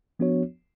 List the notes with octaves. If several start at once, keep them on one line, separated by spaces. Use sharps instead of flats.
F3 B3 D4 F#4 C#5